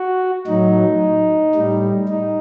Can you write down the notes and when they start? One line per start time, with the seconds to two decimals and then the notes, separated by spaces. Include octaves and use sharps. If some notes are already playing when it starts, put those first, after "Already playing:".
Already playing: F#4
0.47 A2 F#3 D#4
1.55 A2 G3
2.09 D#4